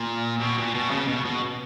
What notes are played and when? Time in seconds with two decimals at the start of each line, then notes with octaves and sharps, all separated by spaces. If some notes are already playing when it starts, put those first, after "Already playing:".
Already playing: A#2
0.40 B2
0.58 A#2
0.74 B2
0.91 C#3
1.07 B2
1.25 B2